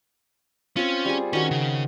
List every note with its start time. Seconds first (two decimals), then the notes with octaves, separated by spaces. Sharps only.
0.76 C4 C#4 F4
1.05 G3 G#4
1.33 D#3 C#4 F#4 C#5
1.51 C#3